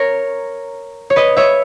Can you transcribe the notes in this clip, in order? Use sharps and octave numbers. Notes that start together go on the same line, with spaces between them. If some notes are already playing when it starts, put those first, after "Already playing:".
Already playing: A#4 C#5
C#5
B4 D#5
C#5 E5